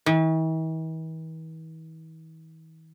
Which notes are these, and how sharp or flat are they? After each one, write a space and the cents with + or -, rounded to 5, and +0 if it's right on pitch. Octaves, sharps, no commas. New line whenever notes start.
E3 -45